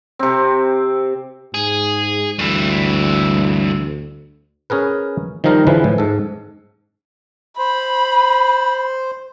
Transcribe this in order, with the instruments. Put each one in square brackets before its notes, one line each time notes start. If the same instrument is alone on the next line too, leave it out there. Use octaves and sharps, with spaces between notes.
[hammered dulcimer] C3 C4
[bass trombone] G#2 [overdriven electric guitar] G#4
[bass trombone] D2 [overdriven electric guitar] G2 E3
[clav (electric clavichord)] C#4 G#4 A#4 B4
D#3 F3 G3 D#4 A#4 C5
D3 E3 F3 G#3 B4
A2
G#2 A4
[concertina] C5 [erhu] B5